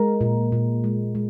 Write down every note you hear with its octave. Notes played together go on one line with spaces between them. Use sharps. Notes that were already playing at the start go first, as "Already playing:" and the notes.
Already playing: G#3 A#4
A#2
A#2
G#3
G#3